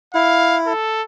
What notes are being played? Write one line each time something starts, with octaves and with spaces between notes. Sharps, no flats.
E4 F5
A4